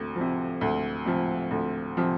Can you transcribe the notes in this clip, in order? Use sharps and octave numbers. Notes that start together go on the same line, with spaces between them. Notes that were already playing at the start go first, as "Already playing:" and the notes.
Already playing: D2 C3
F3
C3
D2
C3 F3
D2
C3 F3